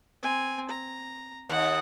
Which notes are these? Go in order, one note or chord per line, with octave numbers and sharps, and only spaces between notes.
C4 G#5
A#5
D#2 F#5